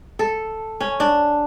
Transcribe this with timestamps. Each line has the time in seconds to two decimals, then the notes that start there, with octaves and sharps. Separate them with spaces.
0.19 A4
0.80 C#4
1.00 D4